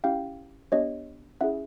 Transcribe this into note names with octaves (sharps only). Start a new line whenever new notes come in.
C#4 E4 G4 F5 G5
B3 D4 G4 C#5 D#5
C#4 E4 G#4 E5 F#5